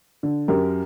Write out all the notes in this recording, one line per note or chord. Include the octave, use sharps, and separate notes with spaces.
D3
F#2 G4 A#4